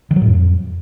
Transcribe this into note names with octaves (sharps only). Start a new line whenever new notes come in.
D#3
F#3
A2
F2